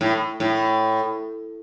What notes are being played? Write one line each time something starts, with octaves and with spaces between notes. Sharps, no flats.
A2
A2